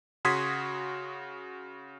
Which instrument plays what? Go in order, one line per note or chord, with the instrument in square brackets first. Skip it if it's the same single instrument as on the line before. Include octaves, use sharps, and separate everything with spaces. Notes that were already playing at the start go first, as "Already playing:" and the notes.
[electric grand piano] C#3 F#4 C6 D#6 G#6 B6